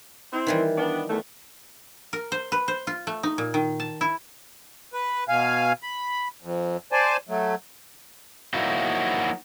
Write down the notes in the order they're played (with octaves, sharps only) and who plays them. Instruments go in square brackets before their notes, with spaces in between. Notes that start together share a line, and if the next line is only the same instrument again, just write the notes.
[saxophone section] C4 E4
[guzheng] D#3 E3 G3
[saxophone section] B3 D4
E2 A3
[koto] A#4
C5
B4
C5
F4
A3
D#4
A#2
D#3
A5
E4
[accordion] B4
B2 F5 G#5
B5
F2
C5 D5 G#5 A5
F#3 A3
[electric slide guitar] F3 F#3 A#3 D#4 E4 F#4